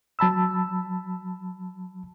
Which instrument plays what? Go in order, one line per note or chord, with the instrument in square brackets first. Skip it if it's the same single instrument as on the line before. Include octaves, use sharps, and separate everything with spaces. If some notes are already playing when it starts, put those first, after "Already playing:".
[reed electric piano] F#3 A5 B5 E6